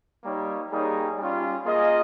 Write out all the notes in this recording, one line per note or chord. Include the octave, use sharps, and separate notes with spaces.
G3 A#3 D#4 A#4 C#5
G3 A#3 D#4 G#4 C#5
G3 C#4 F4
A#3 F4 G#4 D#5